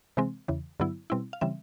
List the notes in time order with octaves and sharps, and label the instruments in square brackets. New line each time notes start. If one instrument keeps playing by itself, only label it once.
[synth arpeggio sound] C3 E3 G#3 C4
E2 C#3 E3
G2 D3 F#3 B3 E4
B2 G3 C4 E4
F5
C#3 E3 G3 C4 E5